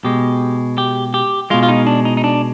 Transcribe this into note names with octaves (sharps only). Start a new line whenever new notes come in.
B2 G#3 G4
G4
G4
B2 G#3 F4
F4
D#4
D4
D#4
D#4
D4